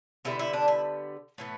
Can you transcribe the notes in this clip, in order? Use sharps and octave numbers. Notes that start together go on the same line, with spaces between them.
D3 G3 B3 E4
E4
D4
E4
A2 E3 B3